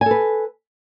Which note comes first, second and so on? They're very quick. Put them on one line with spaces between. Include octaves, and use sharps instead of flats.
G#5 A4 B4